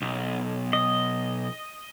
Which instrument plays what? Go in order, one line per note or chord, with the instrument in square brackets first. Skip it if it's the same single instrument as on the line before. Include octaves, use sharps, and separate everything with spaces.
[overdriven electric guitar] B1
[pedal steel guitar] D#5